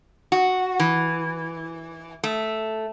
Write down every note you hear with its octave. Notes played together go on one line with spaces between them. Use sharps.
F#4
E3
A3